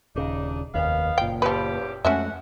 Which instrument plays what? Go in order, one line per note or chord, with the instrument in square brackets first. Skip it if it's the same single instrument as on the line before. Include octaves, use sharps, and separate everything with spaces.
[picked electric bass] D#1 C#3 [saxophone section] D4 D#4
[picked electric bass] F1 D#2 [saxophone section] B3 D#4 F5
[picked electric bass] F#1 A#2 [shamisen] G5
[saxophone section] E2 C#4 G4 [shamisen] F3 B4
[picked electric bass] F2 G#3 A3 [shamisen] C#4 F#4 E5 [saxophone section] F#5